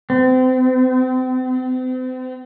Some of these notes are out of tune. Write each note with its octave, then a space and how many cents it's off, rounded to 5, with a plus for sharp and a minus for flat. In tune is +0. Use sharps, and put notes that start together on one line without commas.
C4 -40